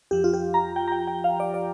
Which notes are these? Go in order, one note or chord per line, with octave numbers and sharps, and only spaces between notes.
F2 F3 G4
F4
G4
A#5
G5
A#5
G5
G5
F5
D5
D5